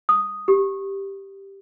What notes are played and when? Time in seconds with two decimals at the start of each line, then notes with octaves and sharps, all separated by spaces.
0.09 D#6
0.48 G4